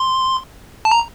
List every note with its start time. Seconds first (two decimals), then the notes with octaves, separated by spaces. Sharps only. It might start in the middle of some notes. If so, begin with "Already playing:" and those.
Already playing: C6
0.85 A5
0.91 A#5